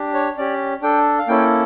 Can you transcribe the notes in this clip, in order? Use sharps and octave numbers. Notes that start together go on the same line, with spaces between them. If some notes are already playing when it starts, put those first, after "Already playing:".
Already playing: D4 G4
C#5
C#4 G4 D5
D4 A4 G5
F5
A#3 C#4 E4 A4 G5